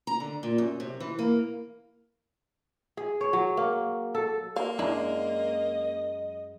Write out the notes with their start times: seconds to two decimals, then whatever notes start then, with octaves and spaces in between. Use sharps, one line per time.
0.07 A#5
0.20 D3
0.43 A#2
0.58 F#2
0.80 C3
1.00 E3
1.19 A#3
2.97 G#4
3.21 C#5
3.33 F#3
3.57 A#3
4.15 A4
4.56 A#3 F5
4.79 F#2 G#3 D4 E4 D5 D#5